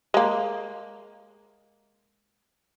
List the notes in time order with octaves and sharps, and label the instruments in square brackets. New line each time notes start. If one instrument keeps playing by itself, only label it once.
[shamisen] G#3 A#3